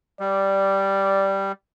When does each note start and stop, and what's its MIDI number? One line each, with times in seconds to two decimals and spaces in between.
0.20 1.52 55
0.20 1.50 74